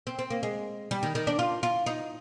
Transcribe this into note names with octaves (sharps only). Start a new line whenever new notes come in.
C4
C4
A#3
G#3
G3
D#3
D#3
D4
F4
F4
D#4